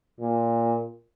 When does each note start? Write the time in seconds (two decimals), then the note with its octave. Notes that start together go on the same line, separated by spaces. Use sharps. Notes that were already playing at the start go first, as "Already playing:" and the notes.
0.20 A#2